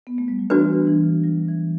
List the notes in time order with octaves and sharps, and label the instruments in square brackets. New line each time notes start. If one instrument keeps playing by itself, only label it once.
[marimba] B3
A3
G3
F#3
[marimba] E3 [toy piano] D4 F#4 B4
[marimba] E3
F#3
E3